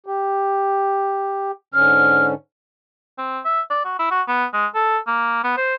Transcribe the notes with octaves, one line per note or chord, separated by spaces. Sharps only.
G4
G#2 D3 C#4 F6
C4
E5
D5
F#4
E4
F#4
B3
G#3
A4
A#3
B3
C5